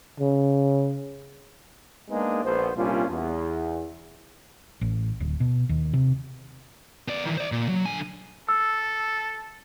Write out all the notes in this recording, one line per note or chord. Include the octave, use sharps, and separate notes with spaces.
C#3
G#3 A#3 B3 D4 D#4 G#4
A#1 B3 C5
C2 A#2 G3 C#4 D4 F4
E2
A1
D1
B2
D#2
C3
B3 D5
D#3 E3
C5 D5
A#2
F#3
D3 G#5
A4 E6